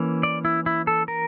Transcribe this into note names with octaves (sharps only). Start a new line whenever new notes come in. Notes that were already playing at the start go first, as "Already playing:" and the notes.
Already playing: E3 A#3 C#4
D5
E4
E4
A4
A#4